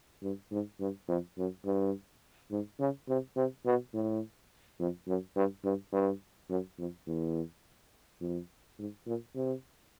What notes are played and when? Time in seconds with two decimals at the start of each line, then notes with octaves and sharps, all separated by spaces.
0.23 G2
0.52 G#2
0.80 G2
1.08 F2
1.38 F#2
1.65 G2
2.51 G#2
2.80 C#3
3.09 C3
3.36 C3
3.65 B2
3.94 A2
4.79 F2
5.07 F#2
5.36 G2
5.64 G2
5.92 G2
6.50 F#2
6.78 F2
7.07 E2
8.21 F2
8.79 G#2
9.07 A#2
9.35 C3